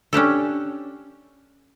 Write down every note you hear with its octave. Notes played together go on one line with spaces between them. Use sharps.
C#4 D4 G4 A4